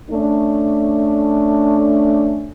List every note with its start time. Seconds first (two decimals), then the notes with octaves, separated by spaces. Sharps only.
0.10 A3 C#4 D4